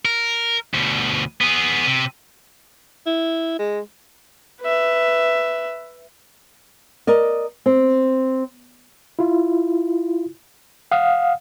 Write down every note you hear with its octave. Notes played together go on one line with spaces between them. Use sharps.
A#4
D2 B2
B3 G#4
C3
E4
G#3
B4 E5
A#4 D5 D#5
C4
E4 F4
F5 F#5 D#6